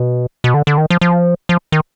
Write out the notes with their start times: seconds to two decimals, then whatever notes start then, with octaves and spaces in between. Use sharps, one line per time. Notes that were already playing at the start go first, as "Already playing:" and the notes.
Already playing: B2
0.44 B2
0.54 D3
0.67 D3
0.78 D#3
0.90 F3
1.01 F3
1.49 F3
1.72 D#3